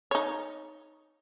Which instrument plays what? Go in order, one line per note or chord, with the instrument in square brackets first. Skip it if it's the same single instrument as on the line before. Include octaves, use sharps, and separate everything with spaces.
[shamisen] D#4 C#5